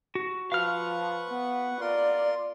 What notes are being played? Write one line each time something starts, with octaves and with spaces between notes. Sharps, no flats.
F#4
F3 B4 F5 F#5 C#6 F6
B3
F4 A#4 D5 C6